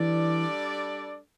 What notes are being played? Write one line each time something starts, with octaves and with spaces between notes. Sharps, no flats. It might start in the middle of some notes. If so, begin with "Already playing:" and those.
Already playing: E3 G3 D4 A4 D5